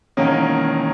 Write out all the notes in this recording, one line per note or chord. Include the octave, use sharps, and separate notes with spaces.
E1 E2 D#3 A#3 C#4